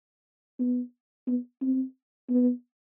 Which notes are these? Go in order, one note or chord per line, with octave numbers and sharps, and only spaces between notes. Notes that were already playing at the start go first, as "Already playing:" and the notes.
B3
B3
C4
B3